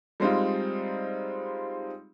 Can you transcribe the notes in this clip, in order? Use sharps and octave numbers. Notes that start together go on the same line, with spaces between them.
G3 G#3 C4 D#4 F4